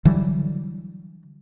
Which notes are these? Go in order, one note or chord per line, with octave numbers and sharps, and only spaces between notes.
D3 E3 F#3 G3